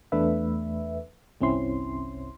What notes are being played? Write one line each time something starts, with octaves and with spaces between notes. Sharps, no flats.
E2 A3 D4 B4 E5
G1 C2 C4 C#4 E4 C6